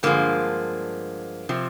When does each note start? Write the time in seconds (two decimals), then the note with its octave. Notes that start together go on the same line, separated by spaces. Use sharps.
0.03 G2 D3 F3 G#3 A#3
1.49 C3 F3